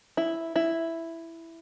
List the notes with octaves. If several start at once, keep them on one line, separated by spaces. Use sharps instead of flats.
E4
E4